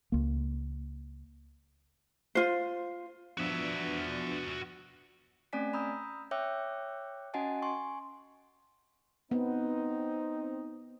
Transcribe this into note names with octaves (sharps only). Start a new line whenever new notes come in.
C#2 A#3
F4 C5
F3 B3 D4 F#4 E5
A3 C4 C#4 D5 G#5 B6
A#5 B5 D#6 E6 G6
C#5 E5 G5 D6 E6 F#6
C#4 F#4 D#5 F#5 G#5 A5
G#5 C6 C#6
B3 C4 D#4